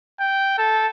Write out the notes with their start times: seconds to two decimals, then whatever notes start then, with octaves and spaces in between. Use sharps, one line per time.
0.20 G5
0.58 A4